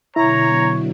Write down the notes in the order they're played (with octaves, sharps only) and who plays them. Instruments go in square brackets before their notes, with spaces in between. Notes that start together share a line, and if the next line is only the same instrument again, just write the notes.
[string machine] B2 D3 F#3 [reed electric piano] E4 [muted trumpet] C#5 [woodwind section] A#5